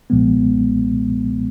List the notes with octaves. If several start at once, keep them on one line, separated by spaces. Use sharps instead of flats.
B1 A#2 F3 G#3 B3